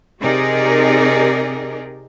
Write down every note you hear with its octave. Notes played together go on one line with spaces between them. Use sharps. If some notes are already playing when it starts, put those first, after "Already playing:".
C3 D#4 G4 G#4 A#4 D5